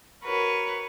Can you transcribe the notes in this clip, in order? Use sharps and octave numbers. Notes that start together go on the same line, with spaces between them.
F#4 A#4 B4 C#5